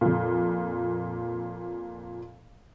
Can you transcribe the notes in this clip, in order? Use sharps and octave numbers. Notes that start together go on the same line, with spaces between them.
F2 A#2